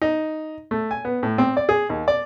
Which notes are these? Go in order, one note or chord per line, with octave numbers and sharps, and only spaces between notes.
D#4
A3
G#5
B3
A2
C4
D5
G#4
D#2
D5